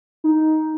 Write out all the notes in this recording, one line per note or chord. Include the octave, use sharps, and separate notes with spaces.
D#4